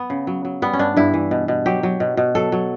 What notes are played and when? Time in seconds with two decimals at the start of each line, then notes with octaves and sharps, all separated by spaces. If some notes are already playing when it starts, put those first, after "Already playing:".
Already playing: B3
0.10 C#3
0.27 F#3
0.45 F#3
0.62 G3 B3
0.73 C#4
0.79 G2 D4
0.96 G2 E4
1.14 E3
1.31 B2
1.48 B2
1.66 F#3 G4
1.83 F#3
2.00 B2
2.17 B2
2.35 F#3 A4
2.52 F#3